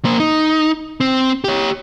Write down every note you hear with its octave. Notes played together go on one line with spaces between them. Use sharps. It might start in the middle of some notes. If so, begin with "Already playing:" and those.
A#3 C5
D#4
C4
G4 C#5